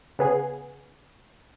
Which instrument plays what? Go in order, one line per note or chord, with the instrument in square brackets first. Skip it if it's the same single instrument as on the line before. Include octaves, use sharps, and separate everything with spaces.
[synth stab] C#3 B3 G#4